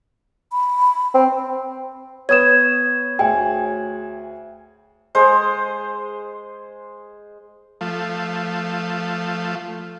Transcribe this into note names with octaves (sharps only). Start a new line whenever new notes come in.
B5
C4
B3 C#5 D#6 G#6 E7
D2 G#4 G5 G#5
G#3 C5
F3 A3